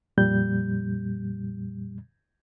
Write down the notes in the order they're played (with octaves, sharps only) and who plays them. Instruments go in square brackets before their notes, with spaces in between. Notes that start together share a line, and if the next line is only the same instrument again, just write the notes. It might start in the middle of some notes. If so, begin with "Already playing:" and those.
[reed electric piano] F2 A#2 G3 G6